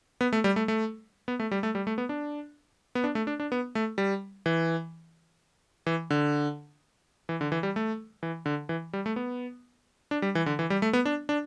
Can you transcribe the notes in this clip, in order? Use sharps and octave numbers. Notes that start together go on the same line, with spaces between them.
B3
A3
G3
A3
A3
B3
A3
G3
A3
G3
A3
B3
D4
B3
D4
A3
D4
D4
B3
A3
G3
E3
E3
D3
E3
D3
E3
G3
A3
E3
D3
E3
G3
A3
B3
D4
G3
E3
D3
E3
G3
A3
B3
D4
D4